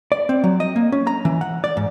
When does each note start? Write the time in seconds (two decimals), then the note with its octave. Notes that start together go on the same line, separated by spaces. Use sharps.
0.12 D5
0.29 C4
0.44 F#3
0.60 D#5
0.76 A#3
0.92 C#4
1.07 A#5
1.25 E3
1.41 F#5
1.64 D5
1.77 G#2